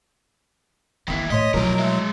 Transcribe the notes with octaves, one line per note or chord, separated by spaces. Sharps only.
D#3 E3 A#3 E4
A2 C#5 D#5 C6 B6
B2 F3 F#3 A3 E4 A#4
G#3 E5